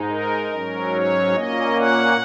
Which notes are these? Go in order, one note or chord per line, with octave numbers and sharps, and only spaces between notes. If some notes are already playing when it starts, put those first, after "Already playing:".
Already playing: G#2 G#3 D#4
A#4
G#2 F#3 C#4
C#5
A#2 A#3 C#4 D#5
F#5